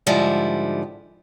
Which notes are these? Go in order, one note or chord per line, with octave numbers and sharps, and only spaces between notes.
G#2 D3 F3 G3 E4